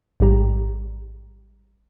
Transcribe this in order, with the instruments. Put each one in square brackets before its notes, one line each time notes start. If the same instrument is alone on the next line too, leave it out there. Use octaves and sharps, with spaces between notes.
[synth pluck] A1 G#2 G3 G4 A#5